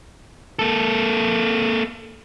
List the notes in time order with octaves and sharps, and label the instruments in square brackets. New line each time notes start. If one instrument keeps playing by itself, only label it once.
[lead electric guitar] A#3 A4